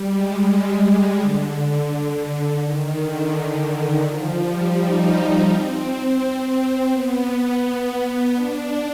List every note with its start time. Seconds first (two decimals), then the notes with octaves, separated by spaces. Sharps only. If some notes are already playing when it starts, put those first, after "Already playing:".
Already playing: G3
0.13 G#3
1.20 D3
2.63 D#3
2.99 D3
3.34 D#3
4.05 F3
4.40 G3
4.76 D#4
5.13 D#4
5.48 C4
6.91 B3
8.33 D4